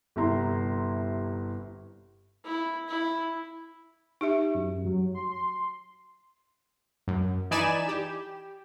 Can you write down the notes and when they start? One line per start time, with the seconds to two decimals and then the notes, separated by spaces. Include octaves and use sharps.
0.16 G1 C3 E4 A#5 C6
2.45 E4
2.88 E4
4.21 D#4 G4 E5
4.54 F#2
4.85 F#3
5.15 C6
5.33 C6
7.08 F#2
7.51 E3 D#4 D5 G#5 B5 E7
7.88 G4